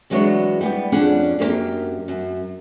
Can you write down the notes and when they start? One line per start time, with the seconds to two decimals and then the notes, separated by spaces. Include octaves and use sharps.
0.10 E2 F#3 G#3 B3 D4 C#5
0.61 G3 B3 G4
0.92 F2 C#4 D4 G#4 F#5
1.39 F#2 A#3 C#4 G4 A#4
2.08 F#2